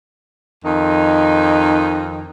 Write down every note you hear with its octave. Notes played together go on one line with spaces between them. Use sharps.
F2 D#3 D#4